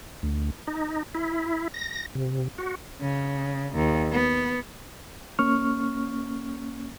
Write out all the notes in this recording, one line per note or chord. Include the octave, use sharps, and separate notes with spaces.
D2
D#4
E4
A#6
C3
F#4
C#3
D#2
B3
A#3 C#4 C#6 F6